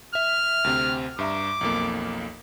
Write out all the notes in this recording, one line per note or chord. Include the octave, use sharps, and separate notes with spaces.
E5 F6
D2 C3 C4
G2 E5 A#5 D6
B1 F2 A#3